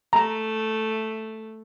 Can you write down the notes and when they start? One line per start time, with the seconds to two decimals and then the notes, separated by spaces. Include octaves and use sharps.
0.13 A3 A#5